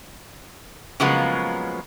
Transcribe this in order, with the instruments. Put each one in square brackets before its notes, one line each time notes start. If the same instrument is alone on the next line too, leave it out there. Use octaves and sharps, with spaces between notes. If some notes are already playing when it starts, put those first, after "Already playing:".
[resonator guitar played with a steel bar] C#3 F3 F#3 G#3 A#3 B3